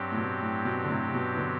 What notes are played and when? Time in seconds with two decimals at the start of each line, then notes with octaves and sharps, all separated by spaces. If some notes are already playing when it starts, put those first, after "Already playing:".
Already playing: G2 F#3 C4 G4
0.11 A2
0.16 B2
0.41 A2
0.65 B2
0.84 D3
0.89 A2 C3
1.07 C3
1.14 B2
1.34 E3
1.38 B2 D3